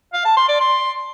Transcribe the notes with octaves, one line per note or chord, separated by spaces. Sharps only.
F5
A5
C6
D5
C6